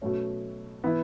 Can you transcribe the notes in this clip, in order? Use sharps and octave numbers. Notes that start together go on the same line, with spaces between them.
B2 F#3 A3 C#4
E3 B3 E4